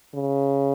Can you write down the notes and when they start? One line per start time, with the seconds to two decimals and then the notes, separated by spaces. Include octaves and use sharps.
0.14 C#3